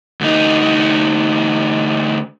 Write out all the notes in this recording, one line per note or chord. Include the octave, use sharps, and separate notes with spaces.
D2 D#4